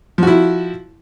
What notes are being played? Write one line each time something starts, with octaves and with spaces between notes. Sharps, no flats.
F3 E4 F#4